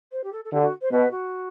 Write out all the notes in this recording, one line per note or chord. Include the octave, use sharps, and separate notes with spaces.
C5
G4
A4
A4
D3 G4
F#4
C5
B2 B4
F#4